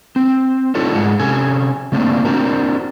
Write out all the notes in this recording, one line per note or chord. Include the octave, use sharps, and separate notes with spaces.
C4
D4 D#4 F4 A4 C#5
G#2 G#3 F4 G#4 F#5
C3 C#4 A4 G#5
C#3 A3 A#3 C4 D4
C4 D4 F#4 A#4